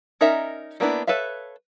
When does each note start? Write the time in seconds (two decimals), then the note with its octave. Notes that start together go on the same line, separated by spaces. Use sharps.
0.21 C#4 D#4 A#4 D5 E5
0.80 G3 A#3 B3 D4 E4
1.07 A4 B4 C#5 E5 F5